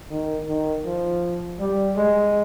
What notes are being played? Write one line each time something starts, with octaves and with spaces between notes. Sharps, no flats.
D#3
D#3
F3
G3
G#3